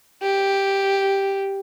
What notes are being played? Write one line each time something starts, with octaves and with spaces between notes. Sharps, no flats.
G4